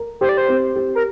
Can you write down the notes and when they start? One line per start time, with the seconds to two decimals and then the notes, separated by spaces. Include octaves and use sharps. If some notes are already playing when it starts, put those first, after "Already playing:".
Already playing: A#4
0.21 G4 C5
0.29 D5
0.38 C5
0.48 C4
0.76 G4
0.95 A#4